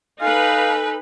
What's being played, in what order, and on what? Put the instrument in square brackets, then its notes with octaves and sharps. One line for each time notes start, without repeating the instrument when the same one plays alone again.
[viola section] D#4 B4 [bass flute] A4 [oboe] F5 [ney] G#5